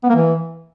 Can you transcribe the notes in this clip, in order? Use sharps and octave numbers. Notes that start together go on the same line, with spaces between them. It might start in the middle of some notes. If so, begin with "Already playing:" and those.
B3
A#3
E3